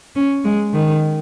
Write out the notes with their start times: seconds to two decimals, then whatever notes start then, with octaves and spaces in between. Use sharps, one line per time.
0.15 C#4
0.44 G#3
0.74 D#3